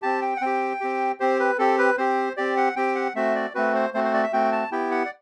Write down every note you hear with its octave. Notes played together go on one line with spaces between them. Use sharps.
C4 G4 A5
G5
F#5
C4 G4 G5
C4 G4
C4 G4 C5
B4
C4 G4 A4
B4
C4 G4 C5
C4 G4 D5
F#5
C4 G4 G5
F#5
A3 C4 F#4 E5
D5
A3 C4 F#4 B4
C5
A3 C4 F#4 C5
C5
D5
E5
A3 C4 F#4 G5
A5
B3 E4 G4 G5
F#5
D5